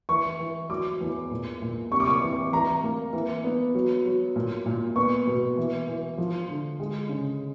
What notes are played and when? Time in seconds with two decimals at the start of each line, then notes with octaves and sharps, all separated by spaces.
0.09 E3 C#6
0.39 E3
0.70 F#3 D6
1.01 E2
1.31 A#2
1.62 A#2
1.91 C3 C#6
2.00 D6
2.07 C#6
2.22 E3
2.52 E3 A#5
2.83 A#3
3.13 E3
3.44 B3
3.74 F#3
4.05 F#3
4.36 A#2
4.66 A#2
4.96 B3 C#6
5.27 B2
5.58 E3
5.87 E3
6.18 F3
6.48 D3
6.80 G#3
7.09 C#3